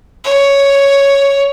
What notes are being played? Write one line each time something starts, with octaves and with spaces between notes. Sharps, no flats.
C#5